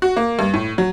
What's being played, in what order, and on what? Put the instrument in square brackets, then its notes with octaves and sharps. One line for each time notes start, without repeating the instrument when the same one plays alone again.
[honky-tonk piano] F#4
A#3
G2
A2
F#3